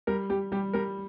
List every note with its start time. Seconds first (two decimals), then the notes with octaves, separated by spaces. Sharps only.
0.07 G3 A#4
0.30 G3 G4
0.52 G3 G4
0.73 G3 A#4